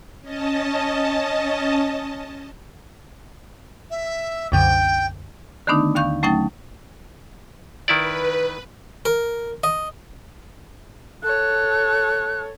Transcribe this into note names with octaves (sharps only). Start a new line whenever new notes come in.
C#4 D#5 A5
E5
C2 F#2 D3 G5
D3 D#3 A3 B3 D4 D#4
D#2 D3 F5 C#6 G6
F#3 A3 C#4 D#4 G5 A6
D#3 E4 B4 D5
A#4
D#5
A4 C#5 F#6